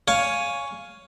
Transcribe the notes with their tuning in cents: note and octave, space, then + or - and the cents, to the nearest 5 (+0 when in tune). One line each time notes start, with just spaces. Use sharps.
C#5 +5 F5 +0 G#5 +0